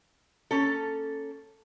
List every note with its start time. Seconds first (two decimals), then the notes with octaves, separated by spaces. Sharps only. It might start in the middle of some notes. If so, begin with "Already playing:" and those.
0.51 A#3 C#4 A4